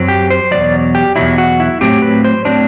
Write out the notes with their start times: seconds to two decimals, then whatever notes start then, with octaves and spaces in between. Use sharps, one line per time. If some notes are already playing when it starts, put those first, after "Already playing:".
Already playing: F#2 F#3 C4
0.08 G4
0.30 C5
0.51 E2 B2 F#3 D5
0.95 G4
1.16 E2 B2 F#3 E4
1.38 F#4
1.60 E4
1.81 A2 F#3 C4 G4
2.02 B4
2.24 C5
2.45 A2 F#3 C4 D4